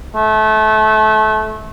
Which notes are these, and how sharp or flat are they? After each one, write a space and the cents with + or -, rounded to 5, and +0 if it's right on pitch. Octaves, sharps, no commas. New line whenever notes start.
A3 -25